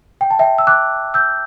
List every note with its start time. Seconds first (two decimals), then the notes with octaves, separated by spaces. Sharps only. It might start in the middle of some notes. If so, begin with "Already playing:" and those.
0.21 G5
0.31 A5
0.39 E5 G5
0.58 E6
0.67 D6 F#6
1.14 E6 G6